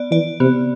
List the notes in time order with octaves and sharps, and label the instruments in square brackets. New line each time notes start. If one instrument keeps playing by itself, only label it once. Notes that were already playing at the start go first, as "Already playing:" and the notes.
Already playing: [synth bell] B3 D5
[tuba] E3 [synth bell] D5
[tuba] C3 [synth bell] B3